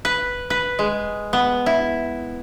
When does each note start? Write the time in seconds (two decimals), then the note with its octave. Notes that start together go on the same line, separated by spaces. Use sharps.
0.05 B4
0.50 B4
0.79 G#3
1.33 B3
1.66 E4